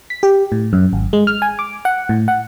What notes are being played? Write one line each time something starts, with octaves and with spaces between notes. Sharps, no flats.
B6
G4
A2
F#2
G#1
G#3
F6
G#5
D6
F#5
A2
F#5